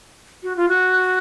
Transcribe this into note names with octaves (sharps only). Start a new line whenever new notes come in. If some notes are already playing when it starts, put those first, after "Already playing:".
F#4
F4
F#4